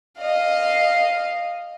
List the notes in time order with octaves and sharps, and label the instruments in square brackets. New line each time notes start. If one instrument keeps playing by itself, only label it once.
[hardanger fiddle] D#5 F5